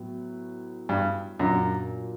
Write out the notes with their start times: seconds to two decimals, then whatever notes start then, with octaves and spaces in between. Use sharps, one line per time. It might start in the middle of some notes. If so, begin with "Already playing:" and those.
Already playing: A2 F#3 B3
0.89 G2
1.39 F#2 A#2 F#3 A#3 D4